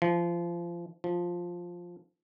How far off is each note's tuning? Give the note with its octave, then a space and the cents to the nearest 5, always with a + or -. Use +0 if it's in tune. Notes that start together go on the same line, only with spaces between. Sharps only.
F3 -25
F3 +5